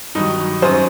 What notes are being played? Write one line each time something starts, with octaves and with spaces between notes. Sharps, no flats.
G2 D#3 F#3 D#4
F#2 F#3 C5